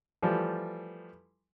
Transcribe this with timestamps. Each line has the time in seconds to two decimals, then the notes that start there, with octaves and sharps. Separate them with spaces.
0.22 E3 F3 G3 A3